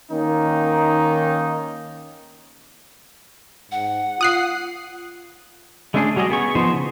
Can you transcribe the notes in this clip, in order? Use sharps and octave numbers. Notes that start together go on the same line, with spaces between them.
D#3 A#3 C#4 D#4
G#2 F#5
F4 D#6 F#6 C7
G#3 A3 C#4 D4 G#4
F#3 G3 F#4 G#4 D#5
B3 G#4 C#6
F3 B3 D#4 C5
C#3